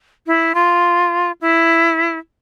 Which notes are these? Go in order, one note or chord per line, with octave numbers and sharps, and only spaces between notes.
E4
F4
E4